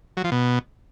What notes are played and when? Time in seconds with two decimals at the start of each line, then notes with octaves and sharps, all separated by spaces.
0.17 F#3
0.24 F3
0.32 B2